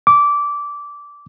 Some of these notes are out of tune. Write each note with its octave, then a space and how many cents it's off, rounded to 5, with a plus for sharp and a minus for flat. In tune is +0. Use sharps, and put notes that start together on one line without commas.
D6 -15